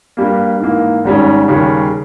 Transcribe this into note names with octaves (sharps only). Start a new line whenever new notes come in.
G2 G3 A#3
G#2 E3 A#3
G#1 G#2 G3 C#4
D#2 C#3 G3 C#4